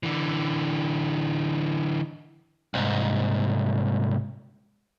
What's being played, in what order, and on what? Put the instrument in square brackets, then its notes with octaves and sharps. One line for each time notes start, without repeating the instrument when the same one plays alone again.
[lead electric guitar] D3 E3
[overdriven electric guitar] C2 G#2